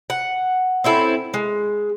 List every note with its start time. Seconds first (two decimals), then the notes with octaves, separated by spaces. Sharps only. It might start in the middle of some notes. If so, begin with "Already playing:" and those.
0.10 F#5
0.84 C4 C#4 E4 A4
1.34 G#3